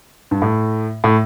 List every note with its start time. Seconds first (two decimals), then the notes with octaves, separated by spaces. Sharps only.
0.31 G2
0.42 A2
1.04 A2